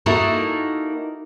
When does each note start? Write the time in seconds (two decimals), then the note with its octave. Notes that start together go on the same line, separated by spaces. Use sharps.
0.06 A#3 D#4 E4 F#4 A4 A#4